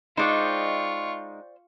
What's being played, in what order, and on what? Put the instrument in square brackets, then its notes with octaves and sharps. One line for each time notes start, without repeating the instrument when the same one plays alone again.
[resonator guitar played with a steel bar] G#3 D#4 [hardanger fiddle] F4 C#6 [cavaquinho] C5 D5 G5